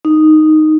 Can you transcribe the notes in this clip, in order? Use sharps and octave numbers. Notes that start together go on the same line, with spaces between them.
D#4